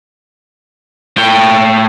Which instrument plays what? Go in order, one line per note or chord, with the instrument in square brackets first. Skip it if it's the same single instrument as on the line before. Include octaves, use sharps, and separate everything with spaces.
[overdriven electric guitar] A2 G5